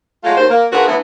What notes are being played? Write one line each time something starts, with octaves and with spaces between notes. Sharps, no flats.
F#3 G#3 A3 F4
D#2 C5
A#3
D3 F4 F#4 G#4 A#4 B4
D3 E3 F#3 A3 B3